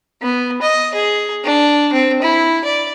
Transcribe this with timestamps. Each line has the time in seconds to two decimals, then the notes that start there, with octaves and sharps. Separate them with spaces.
0.22 B3
0.62 D#5
0.94 G#4
1.44 D4
1.93 C4
2.22 E4
2.64 D5